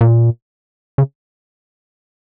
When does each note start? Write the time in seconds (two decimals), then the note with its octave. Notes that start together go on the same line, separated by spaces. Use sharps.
0.01 A#2
0.98 C#3